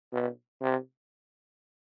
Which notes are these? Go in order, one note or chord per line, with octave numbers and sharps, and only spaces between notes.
B2
C3